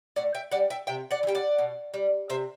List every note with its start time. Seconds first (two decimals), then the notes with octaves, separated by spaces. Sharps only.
0.16 A2 D5 F#5
0.34 E5 G5
0.52 G3 D5 F#5
0.70 E5 G5
0.87 C3 E5 G5
1.11 D5 F#5
1.23 E3
1.27 G3 G5
1.35 D5 F#5
1.58 B2
1.94 G3
2.29 C3 C5 E5